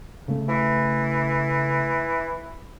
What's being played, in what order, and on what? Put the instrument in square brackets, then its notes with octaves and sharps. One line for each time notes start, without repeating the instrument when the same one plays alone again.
[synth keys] C#3 A3
[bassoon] E3